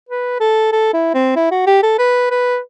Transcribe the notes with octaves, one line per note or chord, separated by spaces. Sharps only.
B4
A4
A4
E4
C4
E4
F#4
G4
A4
B4
B4